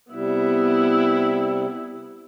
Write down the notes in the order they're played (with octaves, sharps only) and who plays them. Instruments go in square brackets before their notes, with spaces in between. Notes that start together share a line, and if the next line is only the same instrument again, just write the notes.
[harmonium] C3 G3 [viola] B3 E4